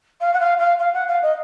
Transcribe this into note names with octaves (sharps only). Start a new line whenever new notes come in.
F5
F#5
F5
F5
F5
F#5
F5
D#5